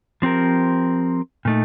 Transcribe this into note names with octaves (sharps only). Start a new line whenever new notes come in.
F3 C4 G4 A#4
A#2 A3 D#4